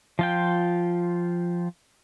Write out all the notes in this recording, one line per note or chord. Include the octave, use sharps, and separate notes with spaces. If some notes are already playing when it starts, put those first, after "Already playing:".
F3 F4 G5